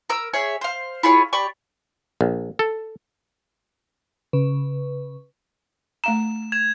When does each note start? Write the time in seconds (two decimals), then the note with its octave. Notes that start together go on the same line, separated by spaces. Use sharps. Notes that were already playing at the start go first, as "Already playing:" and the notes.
0.10 A#4 E6
0.34 G#4 C#5 E5
0.61 C5 F5
1.03 E4 F4 G#4 C#5
1.33 G4 D5 B5 C#6
2.21 A#1
2.59 A4
4.33 C#3 B4
6.04 A3 F5 A#5 E7
6.52 G#6 E7 F7